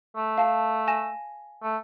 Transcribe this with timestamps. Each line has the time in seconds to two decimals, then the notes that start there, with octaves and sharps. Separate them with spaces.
0.16 A3
0.38 F5 A5
0.88 G#5 A#6 E7
1.63 A3